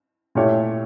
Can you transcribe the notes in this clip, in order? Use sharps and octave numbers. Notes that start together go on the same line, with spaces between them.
A#2 A3 E4 G4 C#5